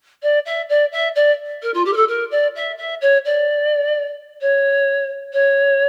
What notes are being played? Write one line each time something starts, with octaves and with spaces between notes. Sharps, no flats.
D5
E5
D5
E5
D5
A#4
F4
G4
A#4
A4
A#4
D5
E5
E5
C#5
D5
C#5
C#5